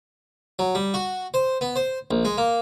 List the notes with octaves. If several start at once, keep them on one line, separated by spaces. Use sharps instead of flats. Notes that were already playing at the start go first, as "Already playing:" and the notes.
F#3
G3
F#4
C5
B3
C5
A#1
G#3
A#3